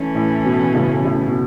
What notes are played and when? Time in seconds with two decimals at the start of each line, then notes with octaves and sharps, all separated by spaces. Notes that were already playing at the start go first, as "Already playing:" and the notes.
Already playing: E3 A3 C#4
0.15 A2
0.45 B2
0.74 A2 C#3
1.05 A2 C#3
1.28 B2